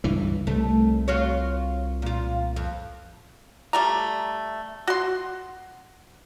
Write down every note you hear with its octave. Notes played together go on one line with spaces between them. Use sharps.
C#2 G2 E3
C2 A3
F4 F#4 C#5
A#2 F4
F2
G3 A3 A#5
F#4 C6